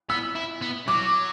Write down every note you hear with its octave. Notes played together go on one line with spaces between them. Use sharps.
B3 E6
E4
B3
F#3 D6